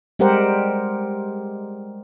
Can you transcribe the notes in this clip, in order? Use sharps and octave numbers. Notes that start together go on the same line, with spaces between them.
G3 G#3 G4 A#4 C5 F#5